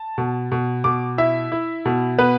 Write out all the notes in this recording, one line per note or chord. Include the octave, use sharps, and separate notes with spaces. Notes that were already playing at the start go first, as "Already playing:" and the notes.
Already playing: A5
B2
B2
B2 D6
E4 E5
E4
B2
B3 B4